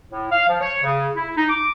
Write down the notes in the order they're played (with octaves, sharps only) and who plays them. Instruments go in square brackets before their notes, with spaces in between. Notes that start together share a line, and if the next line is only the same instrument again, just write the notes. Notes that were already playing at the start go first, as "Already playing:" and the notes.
[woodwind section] A2
F5
F3
C#5
C#3
E4
D#4
D6